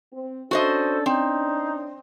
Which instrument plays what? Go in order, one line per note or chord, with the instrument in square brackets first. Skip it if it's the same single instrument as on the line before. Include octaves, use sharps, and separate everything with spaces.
[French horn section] C4
[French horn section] C#4 D4 [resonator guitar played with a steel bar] F#4 C5 D#5 [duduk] A4
[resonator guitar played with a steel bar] C4 [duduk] D#4